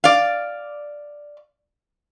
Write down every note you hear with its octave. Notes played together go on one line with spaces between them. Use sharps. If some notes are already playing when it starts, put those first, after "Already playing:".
D5 F5